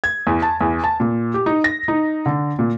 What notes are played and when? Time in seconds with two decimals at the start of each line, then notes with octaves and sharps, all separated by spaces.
0.04 G#6
0.27 E2
0.42 A5
0.61 E2
0.84 A5
1.00 A#2
1.34 G4
1.46 D#4
1.64 A#6
1.88 D#4
2.26 D3
2.59 A#2